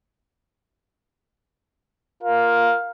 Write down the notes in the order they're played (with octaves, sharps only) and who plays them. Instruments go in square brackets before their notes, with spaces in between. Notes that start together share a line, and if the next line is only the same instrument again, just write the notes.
[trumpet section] F4 A#4 F5